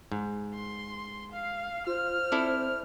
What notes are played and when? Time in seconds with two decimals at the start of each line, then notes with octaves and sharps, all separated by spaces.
0.12 G#2
0.54 C6
1.32 F5 C7
1.87 F4 C5 F6
2.32 C4 E4 A4 D5